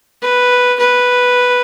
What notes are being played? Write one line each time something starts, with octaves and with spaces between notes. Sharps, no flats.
B4
B4